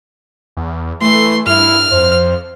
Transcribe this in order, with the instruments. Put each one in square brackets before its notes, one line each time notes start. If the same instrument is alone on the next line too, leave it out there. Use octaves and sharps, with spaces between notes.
[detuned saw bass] E2
[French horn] E3 [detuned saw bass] A3 [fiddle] C6
[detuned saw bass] G2 [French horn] E4 [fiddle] F6
[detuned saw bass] F2 [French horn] C5